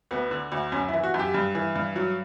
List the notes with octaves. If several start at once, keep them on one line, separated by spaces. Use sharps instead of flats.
D2 B3
D3
D2
F#2 C#4
E4
E3
F#4
F#2
G4
G2
E3
G2
F#3